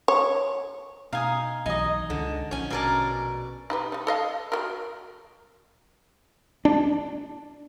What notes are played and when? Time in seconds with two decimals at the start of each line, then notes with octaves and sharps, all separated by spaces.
0.08 C#5
1.13 B2 D#4 F5 G#5 D#6
1.66 B1 E3 D#4 D#5 G#5
2.10 C#2 D3
2.51 A#1 C#4 G#5
2.70 B2 A#4 D5 G#5 A5
3.70 D#4 G4 B4
3.92 G3 D#4
4.07 A4 D#5 F5
4.52 F#4 G4 A#4
6.65 D4